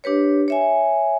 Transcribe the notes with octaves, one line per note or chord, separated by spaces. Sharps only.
D4 G4 B4 C#5
C#5 E5 G#5